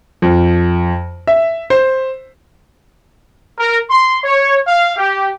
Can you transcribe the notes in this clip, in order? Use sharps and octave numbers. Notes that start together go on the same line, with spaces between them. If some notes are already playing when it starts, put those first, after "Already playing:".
F2
E5
C5
A#4
C6
C#5
F5
G4